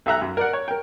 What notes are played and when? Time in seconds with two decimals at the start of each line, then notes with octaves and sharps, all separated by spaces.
0.06 B1 A4 E5 A#5 F#6
0.22 F#2
0.37 A#4 D5 F#5
0.53 C#5
0.68 A#4 G5